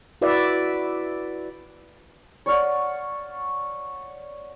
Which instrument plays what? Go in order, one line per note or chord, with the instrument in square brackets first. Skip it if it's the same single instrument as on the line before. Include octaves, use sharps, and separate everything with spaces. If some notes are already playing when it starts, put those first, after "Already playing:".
[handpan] E4 F#4 B4 D5 E5
[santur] C#5 D5 F5 F#5